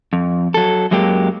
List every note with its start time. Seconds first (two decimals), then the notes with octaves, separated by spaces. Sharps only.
0.13 F2
0.54 F#3 A4
0.91 F#2 F#3 G#3 A#3 G4